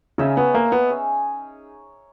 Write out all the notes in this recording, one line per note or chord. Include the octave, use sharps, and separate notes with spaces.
C#3 C#4 D#4 G#4 C#5 E5
B3
A#3
B3
C#4 G#4